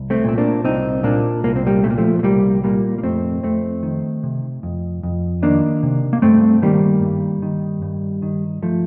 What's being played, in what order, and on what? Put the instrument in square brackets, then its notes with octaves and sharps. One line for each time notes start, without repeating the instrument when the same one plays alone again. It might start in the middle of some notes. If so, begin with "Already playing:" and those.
Already playing: [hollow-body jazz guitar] C2
A3 C4
A#2 C4
A#3 D4
C2 C4 D#4
A#2 A#3 D4
C2 A#3
C4
G3 A#3
A#2 A3
A#3
F3 A3
A3
C2 G3 A#3
A#2 G3 A#3
A#3
F2 A3 C4
F2 A3 C4
D#3
C3
F2
F2
D#3 A#3 D4
C3
A#3
G2 A3 C4
D#3 G3 A#3
G2
D#3
G2
D#3
F3 A3